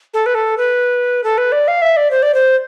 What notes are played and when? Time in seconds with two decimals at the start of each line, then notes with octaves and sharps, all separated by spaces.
0.14 A4
0.26 B4
0.35 A4
0.58 B4
1.24 A4
1.38 B4
1.52 D5
1.68 F5
1.82 E5
1.97 D5
2.11 C5
2.22 D5
2.34 C5